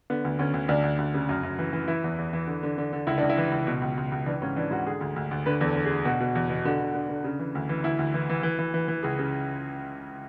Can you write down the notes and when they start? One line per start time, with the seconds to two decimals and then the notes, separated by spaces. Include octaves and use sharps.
0.10 D3 B3
0.25 D2
0.39 D2 C#4
0.54 D2
0.68 D2 D4
0.83 D2
0.98 D2
1.14 C#3
1.29 F#2
1.43 F#2
1.59 E3
1.73 E3
1.88 E3 E4
2.04 E2
2.18 E2
2.33 E3
2.47 D3
2.63 D3
2.78 D3
2.93 D3
3.07 C#2 E4
3.18 C#2 D4
3.30 E4
3.37 E3
3.52 C#2
3.67 B2
3.82 C#2
3.97 C#2
4.12 C#2
4.26 E3 D4
4.42 G#2 C#4
4.56 E3 D4
4.71 G#2 F#4
4.86 D3 G#4
5.01 D2
5.16 D2
5.31 D2
5.46 D3 B4
5.61 E2
5.66 A4
5.76 D3
5.85 G#4
5.90 D3
6.05 B2 F#4
6.20 B2
6.35 E2
6.50 B2
6.65 D3 F#4
6.81 D3
6.94 D3
7.09 D3
7.24 C#3
7.39 E3
7.55 D2
7.69 E3
7.84 D2 E4
7.99 D2
8.14 E3
8.29 E3
8.43 E3
8.59 E3
8.74 E3
8.88 E3
9.03 C#2 G#4
9.19 C#3